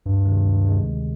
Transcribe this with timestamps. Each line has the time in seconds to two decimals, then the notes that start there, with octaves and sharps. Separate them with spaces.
0.06 D2 G2
0.25 C3 D#3 G#3
0.45 D2
0.66 C3 D#3 G#3
0.85 D2